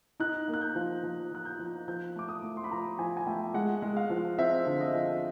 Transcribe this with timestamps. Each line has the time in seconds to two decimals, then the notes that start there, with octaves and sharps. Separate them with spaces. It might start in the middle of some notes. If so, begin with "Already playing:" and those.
0.20 D#4 F#6
0.48 A#3
0.54 F#6
0.61 G6
0.75 F3
1.04 F3
1.31 F3 F#6
1.45 G6
1.59 F3
1.88 F3 G6
2.16 A3 D6
2.29 D#6
2.43 A3
2.57 C6
2.64 B5
2.71 F3 A#5
2.99 F3 G#5
3.17 G#5
3.27 A3 G5
3.54 G#3 F#5
3.82 G#3
3.97 F5
4.10 F3
4.38 C4 E5
4.67 D3
4.80 D#5
4.95 F3